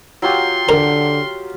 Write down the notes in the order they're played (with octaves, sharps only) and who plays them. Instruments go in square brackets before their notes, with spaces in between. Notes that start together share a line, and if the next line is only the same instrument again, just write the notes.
[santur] F#3 F4 G4 [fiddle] C6
[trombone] D3 [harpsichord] A#4 C5